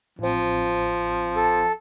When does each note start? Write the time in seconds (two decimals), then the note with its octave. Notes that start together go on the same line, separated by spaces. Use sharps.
0.19 A1 F3 C4
1.36 A4